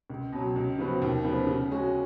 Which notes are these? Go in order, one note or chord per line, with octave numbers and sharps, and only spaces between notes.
C#2
B2 F#3
C#2
C#3 F3 B3 F#4
D#2
C#3 F3 B3
C#3
G#3 C#4 F#4